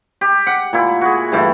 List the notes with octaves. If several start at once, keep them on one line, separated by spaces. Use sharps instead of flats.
G4
F#5
A#2 E4
F#4 G#4
G2 E3 A3